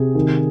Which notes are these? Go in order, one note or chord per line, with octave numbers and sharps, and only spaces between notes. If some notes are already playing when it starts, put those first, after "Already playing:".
Already playing: C3 G#4
D#3